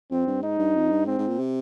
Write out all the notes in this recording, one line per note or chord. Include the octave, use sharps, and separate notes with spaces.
F2 C4
G2
G#2 D#4
G2
F2
G2
G#2 C4
G#2
A#2
C3